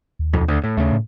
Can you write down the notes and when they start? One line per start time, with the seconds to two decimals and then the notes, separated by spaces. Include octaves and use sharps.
0.19 D#2
0.33 B1 F2
0.48 D2
0.64 A2
0.77 D#2 C#3 A3
0.92 A2